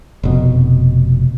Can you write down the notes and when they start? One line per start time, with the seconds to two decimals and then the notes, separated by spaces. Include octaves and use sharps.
0.23 F1 B2